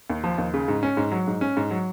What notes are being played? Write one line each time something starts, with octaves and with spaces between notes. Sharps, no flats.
D#2
F3
D#2
C#3
G#2
C#4
G#2
F#3
G#2
C#4
G#2
F#3